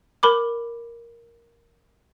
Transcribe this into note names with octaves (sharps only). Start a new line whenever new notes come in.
A#4 B5 D6